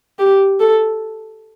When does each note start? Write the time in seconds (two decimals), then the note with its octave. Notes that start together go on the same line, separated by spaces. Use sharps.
0.19 G4
0.60 A4